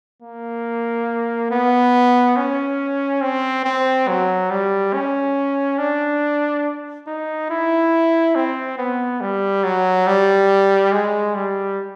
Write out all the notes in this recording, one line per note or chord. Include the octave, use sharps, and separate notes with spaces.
A#3
B3
C#4
C4
C4
F#3
G3
C#4
D4
D#4
E4
C4
B3
G3
F#3
G3
G#3
G3